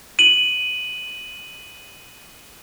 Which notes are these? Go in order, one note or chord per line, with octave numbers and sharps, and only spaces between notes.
D#7 F#7